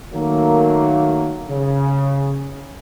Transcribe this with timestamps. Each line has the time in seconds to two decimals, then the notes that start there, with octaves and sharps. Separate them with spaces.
0.14 D#3 F#3 A3 A#3
1.50 C#3